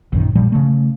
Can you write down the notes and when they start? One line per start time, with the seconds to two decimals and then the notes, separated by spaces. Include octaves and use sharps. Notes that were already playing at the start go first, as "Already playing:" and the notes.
0.12 A#1 F#2 D#3
0.35 A#2 F3 G3
0.52 C#3 A3